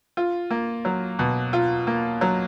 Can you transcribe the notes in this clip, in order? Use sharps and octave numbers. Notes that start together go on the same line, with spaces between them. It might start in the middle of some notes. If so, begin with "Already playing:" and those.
F4
A#3
F#3
B2
F4
A#3
F#3